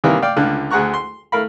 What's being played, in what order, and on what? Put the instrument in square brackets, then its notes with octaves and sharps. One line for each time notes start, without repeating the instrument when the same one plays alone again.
[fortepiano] C3 D#3 E3 G3 A#3
D5 F5 G5
C#2 D3 F4 F#6
D2 G#4 F#5 A#5 C#6 F#6
C6
A3 A#4 F5 B5